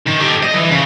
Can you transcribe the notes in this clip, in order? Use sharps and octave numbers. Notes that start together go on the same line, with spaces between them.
D#3
G4 A4
D#5
E3
C#3